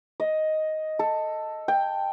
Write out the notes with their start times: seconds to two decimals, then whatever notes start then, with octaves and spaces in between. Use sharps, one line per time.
0.20 D#5
0.99 A4
1.68 G5